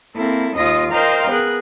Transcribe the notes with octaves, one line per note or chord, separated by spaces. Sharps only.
A#3 C4 E4 A4
D#2 F4 D#5 D#6 A#6
A#4 C5 D#5 F5 G5 A#5
B3 G#4 A#4 F#6